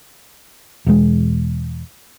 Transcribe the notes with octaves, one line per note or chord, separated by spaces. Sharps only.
E1 G#3